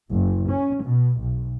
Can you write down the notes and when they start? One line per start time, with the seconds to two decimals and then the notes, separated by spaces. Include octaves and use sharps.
0.12 F#1
0.50 C#4
0.84 B2
1.21 B1